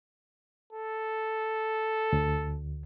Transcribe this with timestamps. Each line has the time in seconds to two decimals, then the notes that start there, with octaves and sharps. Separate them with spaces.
0.73 A4
2.13 D2